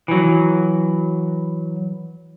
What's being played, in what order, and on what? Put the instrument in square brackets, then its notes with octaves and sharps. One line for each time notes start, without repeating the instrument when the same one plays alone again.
[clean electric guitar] E3 F#3